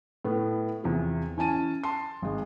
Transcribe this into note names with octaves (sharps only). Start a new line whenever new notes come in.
A2 A3 B3
E2 C3 E3 F3
E3 C#4 G#5 A5 D#7
A5 C6
G#1 G#3